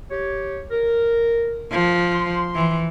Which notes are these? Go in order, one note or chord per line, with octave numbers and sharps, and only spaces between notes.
G4 C#5
A#4
F3
C6
E3